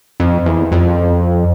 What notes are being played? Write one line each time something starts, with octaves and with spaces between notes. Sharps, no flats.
F2
E2
F2